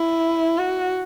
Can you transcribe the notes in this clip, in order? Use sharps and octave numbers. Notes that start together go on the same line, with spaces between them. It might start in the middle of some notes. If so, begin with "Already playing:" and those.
Already playing: E4
F#4